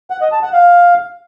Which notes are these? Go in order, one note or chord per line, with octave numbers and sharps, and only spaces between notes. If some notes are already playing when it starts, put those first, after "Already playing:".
F#5
D#5
A5
F#5
F5